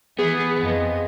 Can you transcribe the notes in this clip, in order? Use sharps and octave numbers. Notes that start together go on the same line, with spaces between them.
E3 B3 G#4
F2 D#5